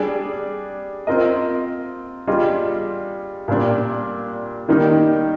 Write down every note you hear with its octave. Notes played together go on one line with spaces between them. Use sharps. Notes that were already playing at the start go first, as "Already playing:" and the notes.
Already playing: G3 D4 G#4 D5
C4 F4 A#4 D#5
G3 D4 F4 G#4 D#5
A#2 G3 D4
D#3 G3 A#3 D#4